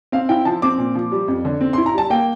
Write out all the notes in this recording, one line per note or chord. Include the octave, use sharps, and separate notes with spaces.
C4 F5
E4 G5
F3 A5
C4 D6
A#2
F3
G3
F2
D3
C4
C6
E4
A#5
G3 A5
A#3 G5